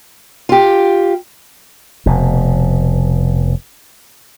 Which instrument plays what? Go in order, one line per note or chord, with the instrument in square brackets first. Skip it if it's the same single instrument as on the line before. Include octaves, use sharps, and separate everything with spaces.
[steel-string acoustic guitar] F4 G4
[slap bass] F1 B2